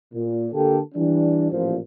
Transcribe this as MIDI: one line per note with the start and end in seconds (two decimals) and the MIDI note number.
0.14 0.47 46
0.52 0.78 50
0.52 0.78 58
0.52 0.78 67
0.52 0.78 69
0.94 1.48 52
0.94 1.48 55
0.94 1.48 62
1.51 1.76 33
1.51 1.76 46
1.51 1.76 53